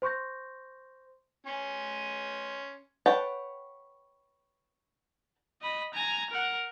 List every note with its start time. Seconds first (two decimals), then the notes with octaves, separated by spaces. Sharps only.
0.02 C5 C6 C#6 G6 A#6
1.47 C#4 G#5 C6
3.06 B4 C#5 F#5 G5 A5
5.62 D#5 B5
5.94 G#5 A#5
6.30 A#4 F#5